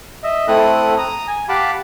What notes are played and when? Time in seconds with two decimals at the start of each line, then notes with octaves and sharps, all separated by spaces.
0.24 D#5 E5
0.48 A3 C4 E4 A4 D#6 F#6
0.98 A#5 D#6
1.28 G#5
1.49 G4 F5 F#5 A5 B5 D6